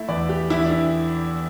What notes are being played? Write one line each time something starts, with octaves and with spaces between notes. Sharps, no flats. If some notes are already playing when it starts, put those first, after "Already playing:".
Already playing: A3 E4 E5
E2 D5
G4
E2 E4
D4
E4